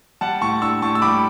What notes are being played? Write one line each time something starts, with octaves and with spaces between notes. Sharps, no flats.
G3 F#5 A5
A2 A5 C#6
D4 C#6 E6
A2 A5 C#6
E6
G3 B5 D6